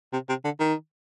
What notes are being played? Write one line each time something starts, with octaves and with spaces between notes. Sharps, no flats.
C3
C3
D3
D#3